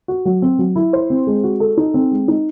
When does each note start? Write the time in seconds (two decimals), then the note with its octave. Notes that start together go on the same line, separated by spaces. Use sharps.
0.08 F#4
0.25 F#3
0.42 C4
0.59 F#3
0.76 E4
0.93 C5
1.10 C4
1.27 G#3
1.44 F#4
1.60 A4
1.77 D#4
1.94 C4
2.11 G#3
2.28 D#4